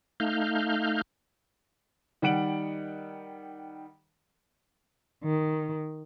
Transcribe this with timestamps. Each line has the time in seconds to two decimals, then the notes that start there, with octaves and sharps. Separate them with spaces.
0.20 A3 D#4 F5 F6 G6
2.22 D#3 G3 F#5 D7 F#7
5.24 D#3